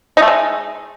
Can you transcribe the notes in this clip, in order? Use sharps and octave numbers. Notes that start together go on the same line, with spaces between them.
D#4
A3
G#3